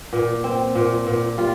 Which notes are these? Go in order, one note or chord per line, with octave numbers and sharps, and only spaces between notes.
A#2
C4
A#2
A#2
G3 F4